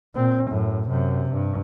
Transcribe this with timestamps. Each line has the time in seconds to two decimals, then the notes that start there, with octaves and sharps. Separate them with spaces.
0.14 A#2 C4
0.49 F#2 A2
0.89 F#2 C3
1.32 G2